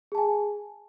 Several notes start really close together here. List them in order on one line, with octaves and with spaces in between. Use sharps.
G#4 A5 G#5